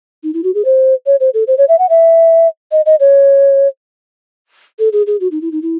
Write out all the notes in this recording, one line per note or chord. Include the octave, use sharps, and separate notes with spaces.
D#4
E4
F#4
G#4
C5
C#5
C5
A4
C5
C#5
E5
F#5
E5
D#5
D#5
C#5
A4
G#4
G#4
F#4
D#4
E4
D#4
E4